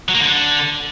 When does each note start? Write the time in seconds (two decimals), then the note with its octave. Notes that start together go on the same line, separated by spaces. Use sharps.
0.09 F#3
0.14 A#3
0.20 D3